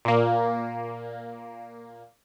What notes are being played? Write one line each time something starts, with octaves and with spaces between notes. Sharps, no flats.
A#2 A#3